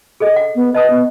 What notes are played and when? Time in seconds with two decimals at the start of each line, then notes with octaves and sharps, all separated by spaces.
0.20 G#4 A4 D#5
0.36 F#5
0.55 B3
0.75 B4 D#5 A5 D#6
0.90 B3